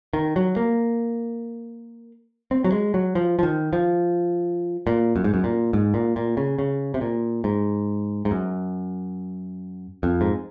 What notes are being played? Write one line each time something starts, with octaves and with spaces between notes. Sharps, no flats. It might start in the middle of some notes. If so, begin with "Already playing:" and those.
D#3
F#3
A#3
C4
F#3
G#3
F#3
F3
F3
D#3
F3
A#2
F#2
G#2
F#2
A#2
G#2
A#2
A#2
C#3
C#3
C3
A#2
G#2
G#2
F#2
F2
G#2